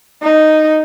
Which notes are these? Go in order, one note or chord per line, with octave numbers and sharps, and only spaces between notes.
D#4